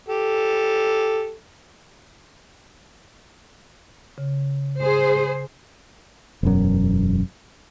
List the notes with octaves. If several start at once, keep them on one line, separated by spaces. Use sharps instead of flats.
G4 A4
C#3
G#4 C5
E1 F#2